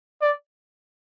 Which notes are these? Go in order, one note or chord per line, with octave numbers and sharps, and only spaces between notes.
D5